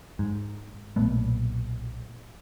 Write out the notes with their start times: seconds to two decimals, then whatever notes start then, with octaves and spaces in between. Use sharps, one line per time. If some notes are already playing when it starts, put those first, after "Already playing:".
0.19 G#2
0.96 B1 A#2 A3 B3